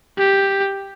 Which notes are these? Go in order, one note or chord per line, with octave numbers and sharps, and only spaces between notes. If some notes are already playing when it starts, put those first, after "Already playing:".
G4